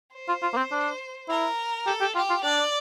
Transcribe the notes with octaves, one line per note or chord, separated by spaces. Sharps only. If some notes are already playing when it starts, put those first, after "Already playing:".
C5
F4
F4
A#3
C4
D4
E4 A#4
G4 A4
G4
F4 G4
F4
D4 D5